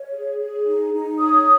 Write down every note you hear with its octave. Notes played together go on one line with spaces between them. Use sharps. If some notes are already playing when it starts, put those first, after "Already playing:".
Already playing: C#5
G#4
G#4
D#4
D#4
C#5 D#6